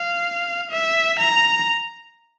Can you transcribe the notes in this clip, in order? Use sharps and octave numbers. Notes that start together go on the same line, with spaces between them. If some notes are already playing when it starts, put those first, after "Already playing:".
Already playing: F5
E5
A#5